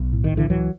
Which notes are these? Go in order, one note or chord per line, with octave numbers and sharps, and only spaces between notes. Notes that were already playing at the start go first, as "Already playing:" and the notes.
Already playing: B1
A2
D#3
B1
D3 E3
C#2 E3 F#3